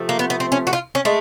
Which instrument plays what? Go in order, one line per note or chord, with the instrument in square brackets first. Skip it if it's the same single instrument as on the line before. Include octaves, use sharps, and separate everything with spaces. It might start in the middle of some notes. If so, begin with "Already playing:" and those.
Already playing: [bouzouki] C3 F3 A3
A#3
B3
B3
C4
C#4
F#4
F4
C#4
G#3 A3